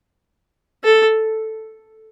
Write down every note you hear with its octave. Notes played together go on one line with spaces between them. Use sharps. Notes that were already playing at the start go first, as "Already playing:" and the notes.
A4